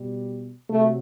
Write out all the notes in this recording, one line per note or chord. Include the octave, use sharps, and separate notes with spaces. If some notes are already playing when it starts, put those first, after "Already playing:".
Already playing: B2 G3
C3 F#3 A3